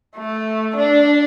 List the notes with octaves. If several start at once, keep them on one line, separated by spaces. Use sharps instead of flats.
A3
D4